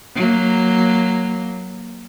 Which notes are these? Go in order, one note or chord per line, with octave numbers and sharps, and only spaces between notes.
F#3 A#3